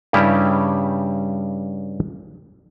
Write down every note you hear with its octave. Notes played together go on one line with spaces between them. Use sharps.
G2 C#3 G3 C#4 E4 G4